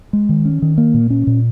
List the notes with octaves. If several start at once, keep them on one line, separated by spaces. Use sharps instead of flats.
G#3
D#3
C#4
D#3
A#3
A#2
C#4
A#2